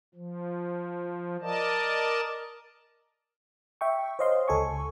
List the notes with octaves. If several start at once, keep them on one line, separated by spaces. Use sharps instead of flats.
F3
A#4 D5 D#5 A5
E5 G5 C#6
C5 C#5 D#5 F5 C6
C#2 A4 G#5 C#6